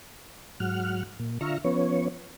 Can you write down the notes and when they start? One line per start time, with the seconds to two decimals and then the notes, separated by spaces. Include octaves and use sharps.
0.60 G#2 F#3 F#5 F6
1.19 A#2
1.41 D3 F4 E5 A#5 C#6 F6
1.65 F3 B3 C#4 C#5